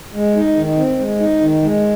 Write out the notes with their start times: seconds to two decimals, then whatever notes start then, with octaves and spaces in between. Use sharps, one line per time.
0.14 G#3
0.36 D#4
0.56 D#3
0.77 C4
0.99 G#3
1.19 D#4
1.41 D#3
1.62 G#3